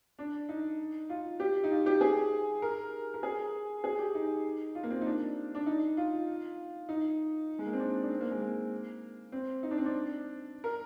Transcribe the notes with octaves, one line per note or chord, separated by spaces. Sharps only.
D4
D#4
F4
G4
D#4
F4
G4
G#4
A#4
A#4
G#4
G#4
G4
D#4
F4
A#3
C4
D#4
D4
D4
D#4
F4
D#4
G#3
A#3
C4
D4
D4
C4
A#3
G#3
A#3
C4
D#4
D4
C4
D4
A#4